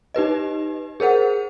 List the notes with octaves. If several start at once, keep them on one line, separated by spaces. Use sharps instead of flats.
D#4 G4 B4 D#5
G#4 A#4 C5 F#5